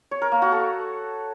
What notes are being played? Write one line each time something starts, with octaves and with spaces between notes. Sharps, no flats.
C#5
A#4
A#3
F#4
A4